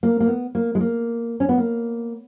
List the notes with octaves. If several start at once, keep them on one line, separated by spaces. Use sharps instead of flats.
A#3
A#3
B3
A#3
G#3
A#3
C#4
B3
A#3